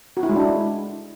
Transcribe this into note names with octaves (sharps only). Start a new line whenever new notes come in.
F#4
E4
G#3
D4
E4